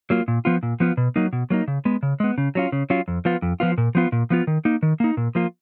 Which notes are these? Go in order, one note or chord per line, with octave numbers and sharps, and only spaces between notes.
F#3 A#3 F4
A#2
F3 B3 F4
A#2
F3 B3 F4
B2
F#3 A#3 D#4
B2
F#3 A#3 D#4
C#3
G#3 B3
C#3
G#3 B3
C#3
F#3 C#4 F4
C#3
F#3 C#4 F4
F2
F3 B3 F4
F2
F3 B3 F4
A#2
F3 B3 F4
A#2
F3 B3 F4
D#3
A#3 D#4
D#3
A#3 D#4
A#2
F3 A#3 F4